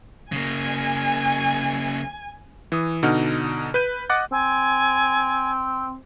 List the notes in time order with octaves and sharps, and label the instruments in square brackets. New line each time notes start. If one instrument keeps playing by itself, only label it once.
[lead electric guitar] C#3 A#3 [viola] G#5
[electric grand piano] E3 D#6
B2 D3 D#4 F#5 F6
B4 G6 D#7
D#5 F#5 D6 F#6 A6
[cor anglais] C4 [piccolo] G#5